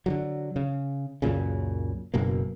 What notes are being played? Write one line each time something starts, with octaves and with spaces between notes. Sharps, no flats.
D3 D#3 F#3
C#3
C#2 F#2 A#2 C#3
F#1 F#2 B2 A#3